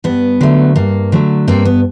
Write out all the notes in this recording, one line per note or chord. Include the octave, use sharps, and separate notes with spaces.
G2 B3
D3 F#3 A3
G2 A#3
D3 F#3 A3
G2 A#3 C4
B3